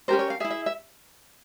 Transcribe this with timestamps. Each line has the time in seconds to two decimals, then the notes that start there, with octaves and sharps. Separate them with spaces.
0.08 C#4 G4 A#4 C5
0.19 C#5
0.30 F5
0.40 G#4 E5
0.45 E4
0.51 E5
0.66 E5